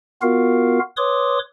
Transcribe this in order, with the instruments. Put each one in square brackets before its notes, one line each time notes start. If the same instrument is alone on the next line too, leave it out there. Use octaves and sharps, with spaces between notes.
[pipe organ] B3 F4 F#4 A#4 F5
B4 C#5 C6 D6 D#6